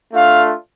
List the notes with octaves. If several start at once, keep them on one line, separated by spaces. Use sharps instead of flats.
A3 D4 F4 F5